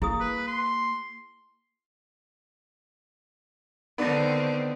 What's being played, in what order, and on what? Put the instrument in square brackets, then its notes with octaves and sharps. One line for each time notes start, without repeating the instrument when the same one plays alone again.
[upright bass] A#3 [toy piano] E4 G#4 D#6
[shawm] B4
C6
[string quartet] D3 D#3 C4 [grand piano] B3 D4